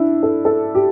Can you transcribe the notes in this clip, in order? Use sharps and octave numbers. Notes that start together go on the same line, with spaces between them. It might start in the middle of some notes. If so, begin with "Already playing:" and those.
Already playing: D4 E4
A4
A4
G4